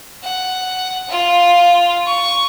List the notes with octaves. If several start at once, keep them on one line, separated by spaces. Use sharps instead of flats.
F#5
F4
C#6